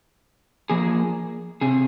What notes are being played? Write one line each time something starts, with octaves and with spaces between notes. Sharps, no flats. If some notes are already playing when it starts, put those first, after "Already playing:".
F3 A#3 G#4
C3 G#4